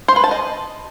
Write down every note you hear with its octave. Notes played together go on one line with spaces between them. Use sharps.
C5
B4
A5
D#5